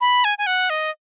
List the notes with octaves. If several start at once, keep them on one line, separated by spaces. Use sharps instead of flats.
B5
G#5
G#5
F#5
D#5